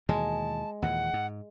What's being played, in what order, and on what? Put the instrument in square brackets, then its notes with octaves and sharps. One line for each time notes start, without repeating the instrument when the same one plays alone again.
[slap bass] D#2 B2 E3 [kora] G#3 [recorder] A5
[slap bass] D#2 A#2 E3 [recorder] F#5
[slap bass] G#2